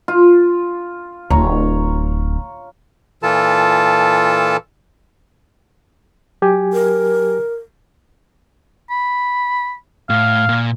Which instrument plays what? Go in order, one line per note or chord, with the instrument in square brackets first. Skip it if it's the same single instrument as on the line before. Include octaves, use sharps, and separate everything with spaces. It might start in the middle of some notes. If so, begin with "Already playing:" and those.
[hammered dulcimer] F4
[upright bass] D1 [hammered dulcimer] C#5 A#5
[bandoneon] A#2 E3 F4 A4 A5
[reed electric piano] F#3 G4 G#5
[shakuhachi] A#4
[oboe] B5
[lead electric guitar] A2 [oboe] F5
[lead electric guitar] A#2